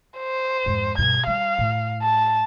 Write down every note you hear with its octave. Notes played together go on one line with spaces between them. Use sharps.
C5
F2 G#2
G2 B2 G#6
G3 F5
A2
A5